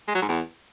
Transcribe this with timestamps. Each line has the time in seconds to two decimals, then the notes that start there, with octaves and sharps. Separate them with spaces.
0.08 G#3
0.15 F#3
0.22 G#2
0.29 E2